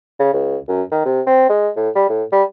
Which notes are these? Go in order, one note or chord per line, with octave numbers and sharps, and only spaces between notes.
C#3
C#2
F#2
D#3
C3
C4
G#3
A2
G3
A2
G3